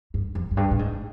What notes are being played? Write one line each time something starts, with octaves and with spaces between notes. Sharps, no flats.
G2
F2
F#2
G2
A2
G#2